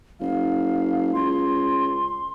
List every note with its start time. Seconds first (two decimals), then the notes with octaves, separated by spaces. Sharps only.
0.21 F#1 F5
1.14 C#2 C6